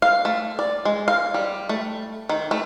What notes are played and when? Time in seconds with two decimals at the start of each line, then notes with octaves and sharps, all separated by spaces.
0.02 F5
0.25 A3
0.59 D5
0.85 G#3
1.08 F5
1.34 G3
1.69 A3
2.29 D#3
2.51 A3